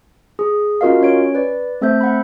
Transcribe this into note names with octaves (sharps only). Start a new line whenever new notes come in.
G#4
C#4 F4 F#4 A#4 D#5 F5
C#4 C#5 D7
B4 D5
A3 C4 A4 C5 E5 G6
F#5 B5